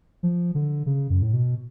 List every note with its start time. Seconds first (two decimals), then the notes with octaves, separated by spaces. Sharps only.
0.23 F3
0.55 D3
0.86 C#3
1.10 F#2
1.22 A2
1.34 B2